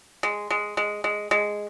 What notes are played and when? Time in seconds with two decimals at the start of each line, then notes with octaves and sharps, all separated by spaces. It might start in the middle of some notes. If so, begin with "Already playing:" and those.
0.23 G#3
0.50 G#3
0.77 G#3
1.04 G#3
1.31 G#3